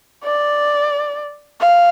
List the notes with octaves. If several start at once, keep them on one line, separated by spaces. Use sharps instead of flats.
D5
F5